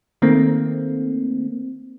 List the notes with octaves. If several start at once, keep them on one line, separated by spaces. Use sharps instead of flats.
D#3 A3 A#3 C4